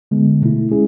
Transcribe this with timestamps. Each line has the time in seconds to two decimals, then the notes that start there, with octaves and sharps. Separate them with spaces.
0.11 D3 G#3 B3
0.41 B2 A3 E4
0.71 G#3 C#4 E4 G#4